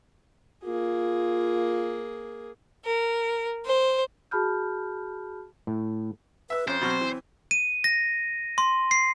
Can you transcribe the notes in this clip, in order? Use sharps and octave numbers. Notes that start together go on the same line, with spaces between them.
A#3 F4 G#4
A#4
C5
F#4 G#4 A5 B5 F6 G6
A2
B4 E5 E6
F2 C#4 C5
B2 F#3 C4 F6
E3
D#7
A#6
C6
C7